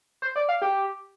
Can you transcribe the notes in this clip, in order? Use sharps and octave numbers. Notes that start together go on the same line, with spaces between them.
C5
D5
F5
G4